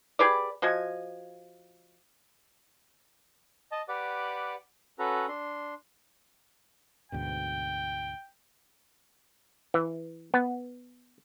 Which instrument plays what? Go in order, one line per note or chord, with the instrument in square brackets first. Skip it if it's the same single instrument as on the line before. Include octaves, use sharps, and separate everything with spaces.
[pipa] G4 G#4 B4 D5
F3 F#4 D#5 G#5
[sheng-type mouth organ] D#5 A5
G4 B4 D5 F#5 D6
C#4 F#4 A4 B4 A#5
D4 C6
[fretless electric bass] D2 G#2 B2 [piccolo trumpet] G5
[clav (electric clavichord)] E3
B3